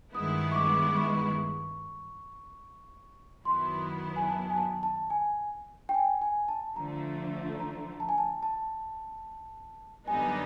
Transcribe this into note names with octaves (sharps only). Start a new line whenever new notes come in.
G2 D#3 G#3 B3 E4 D#6
C#6
D6
C#6
F#2 D#3 F#3 B3 E4 C6
B5
G#5
A5
G#5
A5
A5
G#5
G5
G#5
G#5
A5
D3 F3 A3 A#5
A#5
A5
G#5
A5
A5
F#2 D3 G3 B3 D#4 G#5